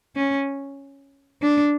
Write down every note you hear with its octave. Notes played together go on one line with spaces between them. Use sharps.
C#4
D4